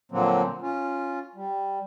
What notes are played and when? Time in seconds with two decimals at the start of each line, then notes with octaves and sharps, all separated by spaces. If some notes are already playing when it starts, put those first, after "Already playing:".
0.12 A#2 D3 F3 F#3 A#3 C4
0.62 C#4 F4
1.35 G3